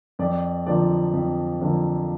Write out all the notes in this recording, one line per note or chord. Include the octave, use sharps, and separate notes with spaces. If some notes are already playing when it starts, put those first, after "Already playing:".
F2 D5
D3 F3 A#3 D5
F2
D3 F3 A#3